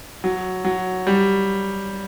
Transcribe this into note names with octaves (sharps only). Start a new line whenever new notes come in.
F#3
F#3
G3